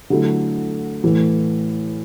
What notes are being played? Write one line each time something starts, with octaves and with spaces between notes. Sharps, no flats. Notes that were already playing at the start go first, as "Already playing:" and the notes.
D3 F#3 A3 E4
A2 E3 A3